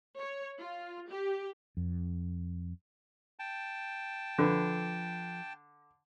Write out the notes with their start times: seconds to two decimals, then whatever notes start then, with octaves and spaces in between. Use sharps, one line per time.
0.19 C#5
0.58 F4
1.09 G4
1.77 F2
3.39 G5 A5
4.39 D3 F3 A4 B4